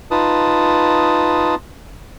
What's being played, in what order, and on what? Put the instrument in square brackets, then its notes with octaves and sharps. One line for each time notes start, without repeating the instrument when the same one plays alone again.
[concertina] D#4 F4 B4 A5 D#6